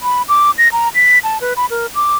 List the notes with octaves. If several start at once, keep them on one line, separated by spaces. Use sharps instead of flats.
B5
D6
A#6
A#5
B6
A5
B4
B5
A#4
D6